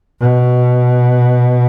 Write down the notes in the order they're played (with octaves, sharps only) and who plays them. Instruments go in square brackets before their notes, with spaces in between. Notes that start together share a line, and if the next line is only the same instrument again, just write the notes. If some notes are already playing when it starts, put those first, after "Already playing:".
[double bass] B2